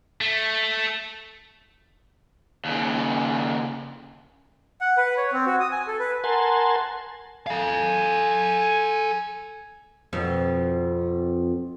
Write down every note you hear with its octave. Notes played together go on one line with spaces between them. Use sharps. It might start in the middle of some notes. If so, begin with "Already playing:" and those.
A3
D#2 C#3
F#5
B4
C#5
C4
F#4
D#6
G#5
A4
B4
A#4 F#5 G#5 A5 C6
A4 F5 G#5
F2 B2